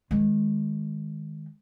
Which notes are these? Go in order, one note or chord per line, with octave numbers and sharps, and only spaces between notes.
D#3 G#3